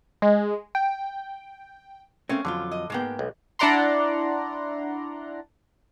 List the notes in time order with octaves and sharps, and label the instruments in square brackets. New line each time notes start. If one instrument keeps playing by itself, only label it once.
[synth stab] G#3
G5
[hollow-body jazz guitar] A3 A#3 C4 [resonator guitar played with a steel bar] C#4
[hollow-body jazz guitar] F2 F#3 F4 [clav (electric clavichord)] D3
[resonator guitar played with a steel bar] D#5
[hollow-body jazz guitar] G#2 B3 [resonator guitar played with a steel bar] G#3 A#3 G5
[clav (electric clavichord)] B1
[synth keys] D4 E4 D5 F#5 A#5 C6